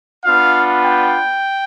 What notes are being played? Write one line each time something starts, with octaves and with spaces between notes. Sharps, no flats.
B3 D4 F4 F5
G5